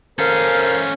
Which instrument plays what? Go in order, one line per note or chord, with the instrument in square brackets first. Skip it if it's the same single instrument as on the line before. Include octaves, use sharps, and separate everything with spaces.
[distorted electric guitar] C#4 A4 [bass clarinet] A#4 [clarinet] C5 [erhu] F5